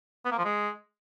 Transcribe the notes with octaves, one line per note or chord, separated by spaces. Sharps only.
B3
A#3
F3
G#3